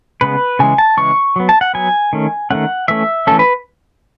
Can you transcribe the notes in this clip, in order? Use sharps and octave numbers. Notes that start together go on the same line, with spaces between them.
C#3 G#3 B3 B4
C#3 E3 G#3 G#5
A5
C#3 E3 G#3 C#6
F#3 B3
A5
F#5
F#3 B3 G#5
D#3 A3 C#4
D#3 A3 C#4 F#5
E3 A3 C#4 E5
E3 A3 C#4 A4
B4